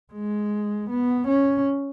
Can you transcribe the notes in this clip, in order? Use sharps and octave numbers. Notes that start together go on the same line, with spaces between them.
G#3
B3
C#4